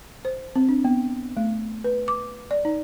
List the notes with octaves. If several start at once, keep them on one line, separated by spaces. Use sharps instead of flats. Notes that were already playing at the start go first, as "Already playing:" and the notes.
C5
C4
D4
B3
A3
B4
D6
D5
D#4